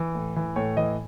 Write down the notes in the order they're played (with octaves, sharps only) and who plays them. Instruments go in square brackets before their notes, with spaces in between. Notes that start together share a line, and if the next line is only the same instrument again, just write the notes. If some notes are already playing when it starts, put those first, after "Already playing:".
Already playing: [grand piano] E3
A2
E3
A2 C#5
E3 D#5